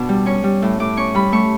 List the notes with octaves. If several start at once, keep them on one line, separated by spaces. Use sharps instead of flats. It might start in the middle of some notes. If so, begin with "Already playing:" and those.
Already playing: B2 D4
G3
C#4 C#6
G3
A2
A2 D6
C#4 C#6
G3 B5
A3 C#6